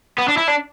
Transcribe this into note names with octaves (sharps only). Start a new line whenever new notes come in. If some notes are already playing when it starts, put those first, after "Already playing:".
B3
D4
E4
D4